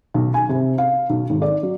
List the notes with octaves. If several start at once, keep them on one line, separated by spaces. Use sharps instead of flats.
B1
G#5
C3
F5
B1
G#1
D5
F#3